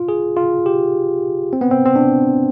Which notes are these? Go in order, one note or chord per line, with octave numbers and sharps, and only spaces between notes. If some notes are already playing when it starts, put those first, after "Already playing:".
Already playing: F4
G#4
F4
G4
C4
B3
C4
C4
D4